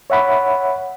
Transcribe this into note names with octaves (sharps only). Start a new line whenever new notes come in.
C#5 E5 F#5 B5